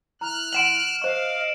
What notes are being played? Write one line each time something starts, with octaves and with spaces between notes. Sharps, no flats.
E4 A#5 F6 F#6
F5 F#5 C6 D7 E7 F#7
C5 D#5 F5 C#6